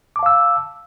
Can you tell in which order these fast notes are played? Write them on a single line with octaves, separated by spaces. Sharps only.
D6 A5 F5 E6